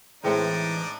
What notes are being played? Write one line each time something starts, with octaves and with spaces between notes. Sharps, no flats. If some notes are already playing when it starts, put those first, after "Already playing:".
A2 E3 G#3 C4 D4 D#4 D5